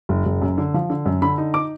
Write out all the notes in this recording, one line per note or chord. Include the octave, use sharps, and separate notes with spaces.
F#1
F#1
F#2
D3
F3
D3
F#2
D3 B5
D#4
D6